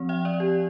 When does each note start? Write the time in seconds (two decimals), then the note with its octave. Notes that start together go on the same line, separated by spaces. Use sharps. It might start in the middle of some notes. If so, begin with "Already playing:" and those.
Already playing: F3 C4
0.09 E5 G5
0.25 D5 F5
0.40 G4